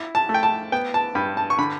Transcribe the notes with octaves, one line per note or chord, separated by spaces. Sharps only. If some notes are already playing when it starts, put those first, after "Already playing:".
Already playing: E4
A5
A3
G5
A5
B3 G5
A5
G2 B5
A5
C#6
D3 B5